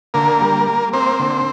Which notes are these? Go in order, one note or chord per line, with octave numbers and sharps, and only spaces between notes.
D3 A#3 A#4
G3
A#3
A#3 C4 C5
D3